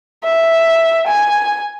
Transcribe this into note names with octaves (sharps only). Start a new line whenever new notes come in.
E5
G#5